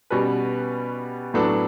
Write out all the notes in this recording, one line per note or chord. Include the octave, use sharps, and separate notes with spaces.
B2 G3 C#4 F#4 B4
A2 F#3 B3 D4 A4